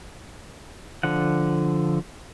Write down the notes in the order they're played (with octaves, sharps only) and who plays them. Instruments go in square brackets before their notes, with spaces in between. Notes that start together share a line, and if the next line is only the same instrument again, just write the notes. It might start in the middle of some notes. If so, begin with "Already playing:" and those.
[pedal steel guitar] D3 F3 F#5